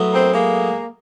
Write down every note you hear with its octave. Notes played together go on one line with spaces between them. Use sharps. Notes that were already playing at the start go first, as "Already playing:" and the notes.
Already playing: A2 F#3 B3
A#3 C4
G#3 A#3